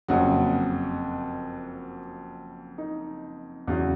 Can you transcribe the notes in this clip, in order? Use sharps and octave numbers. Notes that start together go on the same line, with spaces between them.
F#1 F2 C#3 F#3 F#4
D#4
E2 C#3 F#3